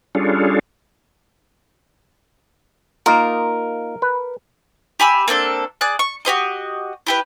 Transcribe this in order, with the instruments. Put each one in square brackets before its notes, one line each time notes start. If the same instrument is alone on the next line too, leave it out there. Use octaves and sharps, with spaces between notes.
[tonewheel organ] G3 C#4 D4 F4 G#4 A4
[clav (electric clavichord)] A#3 D#4 F4 [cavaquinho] A#4
[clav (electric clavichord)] B4
[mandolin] G4 G#5 B5 E6
A#3 C4 D4 A4
G#4 D5 F#6
C#6
F#4 G4 C5 D#5
E4 G4 B4